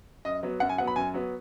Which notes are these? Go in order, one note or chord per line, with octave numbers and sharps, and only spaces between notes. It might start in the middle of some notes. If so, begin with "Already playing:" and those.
F#2 D#5
F#3 B3
F#2 F#5
G#5
F#3 B3 F#5
B5
F#2 G#5
F#3 B3